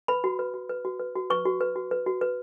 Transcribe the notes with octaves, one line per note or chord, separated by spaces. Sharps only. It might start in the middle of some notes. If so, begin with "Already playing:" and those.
B4 B5
F#4
B4
F#4
B4
F#4
B4
F#4
B4 C#6
F#4
B4
F#4
B4
F#4
B4